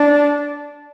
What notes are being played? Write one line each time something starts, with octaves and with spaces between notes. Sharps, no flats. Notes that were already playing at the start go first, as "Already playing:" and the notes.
Already playing: D4